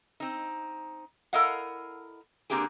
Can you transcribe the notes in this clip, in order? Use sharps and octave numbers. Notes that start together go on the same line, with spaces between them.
C4 D#4
E4 A4 A#4 D#5 F5 F#5
D3 A#3 C4 D4 G4 G#4